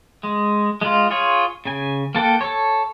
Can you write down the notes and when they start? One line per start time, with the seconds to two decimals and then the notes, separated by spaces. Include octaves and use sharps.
0.23 G#3
0.81 G#3 F4
1.11 F4 G#4 C#5
1.65 C#3 G#5
2.15 A#3 A4 F#5 G5
2.41 A4 C#5